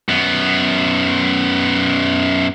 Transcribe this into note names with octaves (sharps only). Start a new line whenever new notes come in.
F#2 B3